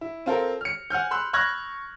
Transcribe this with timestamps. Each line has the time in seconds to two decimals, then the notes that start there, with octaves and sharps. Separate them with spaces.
0.01 E4
0.26 C4 F4 A4 A#4
0.61 F6 C#7
0.90 F#5 G#5 F6 G6
1.11 B5 C6 E6 F#6
1.33 B5 C#6 F6 F#6 G#6 A#6